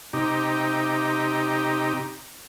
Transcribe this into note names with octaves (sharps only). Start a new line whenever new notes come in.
C3 D#4 G4